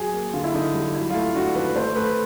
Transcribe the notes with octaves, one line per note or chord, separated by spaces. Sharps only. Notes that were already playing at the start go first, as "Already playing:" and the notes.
Already playing: F#3 G#4
A#3
D3 F4
E4
D3 D#4
G3
F#3 E4
F4
A3 E4
D4 F#4
D#3 B4
A3 C5
A3 B4